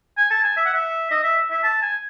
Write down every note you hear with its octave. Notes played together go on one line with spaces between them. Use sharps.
G#5
A5
G#5
E5
F#5
E5
D#5
E5
E5
A5
G#5